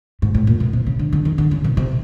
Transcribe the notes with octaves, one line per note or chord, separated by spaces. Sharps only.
G#2
A2
A#2
B2
C3
C#3
D3
D3
D#3
D3
C#3
B2
C3